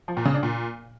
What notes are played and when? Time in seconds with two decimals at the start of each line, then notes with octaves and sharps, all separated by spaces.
0.08 F3
0.17 A#2
0.25 C#3
0.34 D4
0.43 A#2